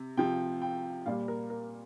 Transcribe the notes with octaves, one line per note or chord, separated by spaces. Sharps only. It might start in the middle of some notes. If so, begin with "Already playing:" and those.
Already playing: C3
C3 F3 G5
G5
A#2 G3 F5
A#4
A#4